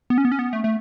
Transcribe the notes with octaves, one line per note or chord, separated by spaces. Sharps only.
B3
C#4
B3
C#4
B3
A3
A3